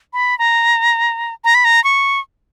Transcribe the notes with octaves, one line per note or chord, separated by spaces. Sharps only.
B5
A#5
A#5
B5
A#5
C#6